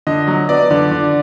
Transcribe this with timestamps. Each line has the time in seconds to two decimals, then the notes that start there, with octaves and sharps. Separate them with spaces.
0.07 D3 D#5
0.27 F#3
0.49 B3 D5
0.71 D3
0.91 D3